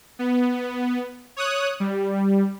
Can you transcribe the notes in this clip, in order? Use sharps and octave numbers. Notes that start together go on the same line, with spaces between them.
B3
C#5 D#6 F#6
G3